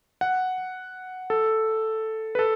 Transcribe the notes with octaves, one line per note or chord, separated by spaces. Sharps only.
F#5
A4
B4
A4